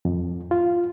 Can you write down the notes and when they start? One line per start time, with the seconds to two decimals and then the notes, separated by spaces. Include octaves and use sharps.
0.05 F2
0.51 F4